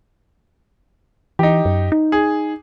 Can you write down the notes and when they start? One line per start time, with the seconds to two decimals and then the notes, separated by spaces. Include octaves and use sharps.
1.39 E3 D#4 G4
1.65 F#2
1.92 D#4
2.12 G#4